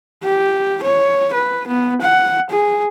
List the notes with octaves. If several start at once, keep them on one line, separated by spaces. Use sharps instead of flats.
G4
C#5
B4
B3
F#5
G#4